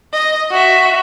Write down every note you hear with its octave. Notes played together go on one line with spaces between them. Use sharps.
D#5
F#4 E5